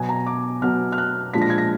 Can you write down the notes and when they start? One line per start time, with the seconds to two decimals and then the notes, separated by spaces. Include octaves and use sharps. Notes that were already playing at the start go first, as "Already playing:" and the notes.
Already playing: B2 F#3 B3 G#5
0.09 A#5
0.26 D6
0.62 B2 F#3 B3 F6
0.92 F6
0.98 F#6
1.34 A#2 F3 G#3 D4 B6
1.42 A#6
1.50 G#6
1.58 A#6